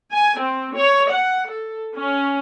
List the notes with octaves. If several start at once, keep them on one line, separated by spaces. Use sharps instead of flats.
G#5
C4
C#5
F#5
A4
C#4